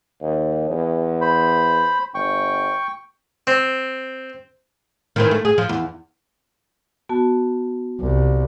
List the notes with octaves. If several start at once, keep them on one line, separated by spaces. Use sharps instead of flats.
D#2
E2
C5 B5
G1 G5 C#6
C4
D#3 E3 C4
A3
G#4
F3
E2
B3 F#4 A5
C2